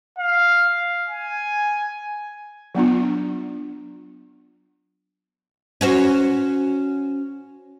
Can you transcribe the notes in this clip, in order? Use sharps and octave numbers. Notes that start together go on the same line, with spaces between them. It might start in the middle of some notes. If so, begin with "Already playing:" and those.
F5
G#5
F#3 B3 D4 F4
C#4 F#4 C5